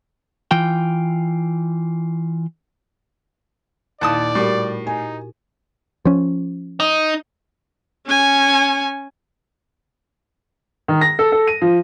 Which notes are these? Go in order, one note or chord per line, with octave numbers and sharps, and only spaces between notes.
E3 F4 G5
D#2 A#2 D#4 E4 D5 A5 D#6
A2 G3 F#4 G4 A#4
D#4 G#5
F3 C#4
D#4
C#4 G#5
D#3
A#6
A4
A4
D#7
F3